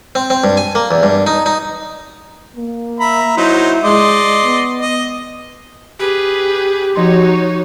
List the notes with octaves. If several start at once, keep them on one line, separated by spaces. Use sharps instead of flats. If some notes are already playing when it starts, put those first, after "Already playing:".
C4
C4
G2
G#5
A#3
E2
G2
D#4
D#4
A#3
E5 A#5 B5
F#3 D#4 E4 C5
G#3 D5 D#5 C6
B3
D#5
G4 G#4 B4
F3 D#4 F#4 C#5 C6